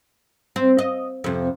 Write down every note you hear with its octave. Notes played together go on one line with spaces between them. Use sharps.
C4
D#5
F2 C3